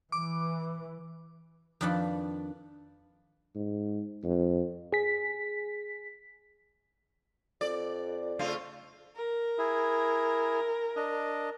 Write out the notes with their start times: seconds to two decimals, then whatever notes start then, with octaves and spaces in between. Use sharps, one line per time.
0.12 E3 D6
1.81 F2 D#3 D4 B4 A5
3.55 G#2
4.24 F2
4.93 G#4 B6
7.61 F2 D5
8.39 C#3 A3 F4
9.16 A#4
9.58 E4 G#4
10.96 D4 D#5